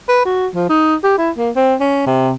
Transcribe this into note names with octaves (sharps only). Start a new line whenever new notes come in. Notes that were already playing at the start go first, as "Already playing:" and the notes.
B4
F#4
F3
D#4
G4
E4
A#3
C4
C#4
C3